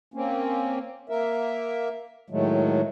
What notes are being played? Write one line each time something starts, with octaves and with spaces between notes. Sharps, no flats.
A#3 C4 C#4
A#3 A#4 E5
A2 D#3 F#3 G#3 A3